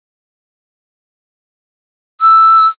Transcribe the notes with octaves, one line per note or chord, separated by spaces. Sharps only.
E6